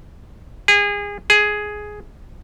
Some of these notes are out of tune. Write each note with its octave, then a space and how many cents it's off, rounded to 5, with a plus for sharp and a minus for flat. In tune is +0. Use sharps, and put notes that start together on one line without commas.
G#4 -25
G#4 +10